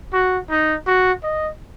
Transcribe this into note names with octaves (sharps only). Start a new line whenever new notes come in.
F#4
D#4
F#4
D#5